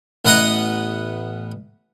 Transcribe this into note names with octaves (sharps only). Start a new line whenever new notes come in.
A1 B3 B4 D#5 F#5 A#5